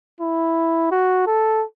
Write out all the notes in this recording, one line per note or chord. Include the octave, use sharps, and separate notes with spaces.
E4
F#4
A4